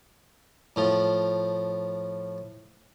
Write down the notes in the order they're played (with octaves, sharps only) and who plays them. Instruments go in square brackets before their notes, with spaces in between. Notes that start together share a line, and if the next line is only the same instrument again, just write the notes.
[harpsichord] A2 F3